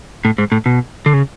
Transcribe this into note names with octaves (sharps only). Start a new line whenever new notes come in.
A2
G#2
A2
B2
D3
C#3